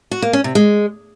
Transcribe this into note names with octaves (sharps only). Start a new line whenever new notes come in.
F#4
A#3
C#4
C3
G#3